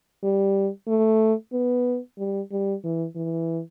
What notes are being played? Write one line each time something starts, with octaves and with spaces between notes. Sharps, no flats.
G3
A3
B3
G3
G3
E3
E3